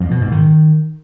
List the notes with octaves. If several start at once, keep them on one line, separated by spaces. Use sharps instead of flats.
F2
B2
G#2
D#3